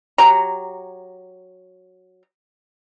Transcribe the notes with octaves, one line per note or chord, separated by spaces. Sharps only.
F#3 G4 A#5